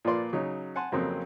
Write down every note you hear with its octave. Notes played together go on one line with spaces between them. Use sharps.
A#2 F3 F4 B4 D5 C6
C#3 F#3 D#4
F#5 G#5 A5 C6
F2 C#3 F#3 A#3 C4